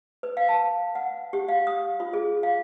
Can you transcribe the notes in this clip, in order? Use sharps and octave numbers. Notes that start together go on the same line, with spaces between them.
B4
F5
A5
F#5
G4
F5
D#6
F4
G#4
F5